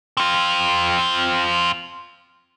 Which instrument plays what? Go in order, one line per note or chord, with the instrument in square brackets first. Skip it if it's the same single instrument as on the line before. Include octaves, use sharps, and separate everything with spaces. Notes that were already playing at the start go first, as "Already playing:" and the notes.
[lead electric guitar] C4 F4